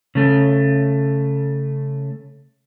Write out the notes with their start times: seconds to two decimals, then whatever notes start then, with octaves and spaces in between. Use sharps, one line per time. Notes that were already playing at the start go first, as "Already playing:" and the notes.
0.15 C#3 A3